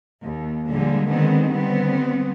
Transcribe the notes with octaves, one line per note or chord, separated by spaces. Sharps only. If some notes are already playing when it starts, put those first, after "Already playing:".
D#2
A#2 D3 F3 G3 G#3
D3 D#3 G#3 B3 C4
D3 G3 B3 C4